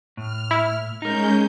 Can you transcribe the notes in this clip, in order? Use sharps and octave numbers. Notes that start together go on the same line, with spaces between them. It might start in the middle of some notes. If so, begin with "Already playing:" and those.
A2 F6
E4
G#3 C#4 D#4 A#4 G6